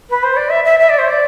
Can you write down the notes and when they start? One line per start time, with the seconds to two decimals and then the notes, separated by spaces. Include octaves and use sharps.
0.10 B4
0.23 C5
0.37 D5
0.50 E5
0.65 E5
0.79 E5
0.89 D5
0.98 C5
1.08 D5